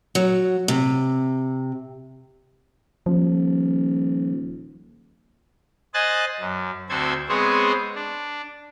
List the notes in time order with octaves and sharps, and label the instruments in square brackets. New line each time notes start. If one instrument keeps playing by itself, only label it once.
[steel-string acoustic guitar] F#3
C3
[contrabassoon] D#1 [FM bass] F3
[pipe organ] C5 D#5 G#5 F#6 A6
F#2
D2 C4 F#4 A4 C5 G#6
G#3 B3 C4 G#4 C5 C#5
D4